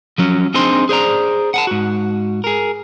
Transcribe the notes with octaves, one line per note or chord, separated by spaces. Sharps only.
F3 F#3 C#4
C4 D4 D#4 G#4 C5 C6
G#4 C5 D5 A#5
F#5 G#5 A5
G#2 F#4
G#4 A#4